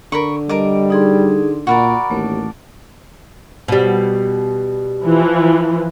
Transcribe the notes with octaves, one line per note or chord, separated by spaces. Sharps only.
D3 A#4 B5 C#6
G3 A#4 D#5 A5 D6
D#4 G#4 C6
A#2 F#4 A#4 D5 A#5 B5 C#6
A1 D#2 A3
B2 G3
E3 F3